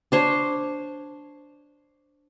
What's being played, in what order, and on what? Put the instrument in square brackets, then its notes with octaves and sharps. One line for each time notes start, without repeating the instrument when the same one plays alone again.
[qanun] D4 C5 C#5